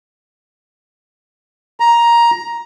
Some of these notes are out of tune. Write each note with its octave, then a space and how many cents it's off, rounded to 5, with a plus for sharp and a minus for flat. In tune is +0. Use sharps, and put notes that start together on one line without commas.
A#5 +10